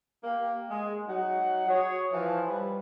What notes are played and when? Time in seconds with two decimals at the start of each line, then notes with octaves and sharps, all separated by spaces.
0.24 A#3 G4
0.70 G#3
1.08 F#3 D#4 F#5
1.68 F#4 G#4 C#5
2.12 E3 F3
2.48 G3 B4